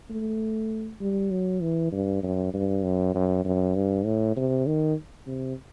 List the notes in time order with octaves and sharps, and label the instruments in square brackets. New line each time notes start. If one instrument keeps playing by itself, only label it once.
[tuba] A3
G3
F#3
E3
G2
F#2
G2
F#2
F#2
F#2
G2
A2
C3
D#3
C3